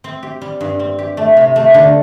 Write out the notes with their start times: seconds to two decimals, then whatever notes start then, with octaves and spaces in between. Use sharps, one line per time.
0.04 C4
0.23 G4
0.41 G3
0.61 G2
0.79 C4
0.99 G4
1.17 A3
1.37 C3
1.56 A3
1.74 D3